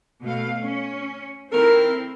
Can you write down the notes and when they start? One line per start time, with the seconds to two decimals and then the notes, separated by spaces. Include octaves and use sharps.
0.25 B2 A3 F5
0.62 C#4
1.52 D#3 C4 E4 A4 A#4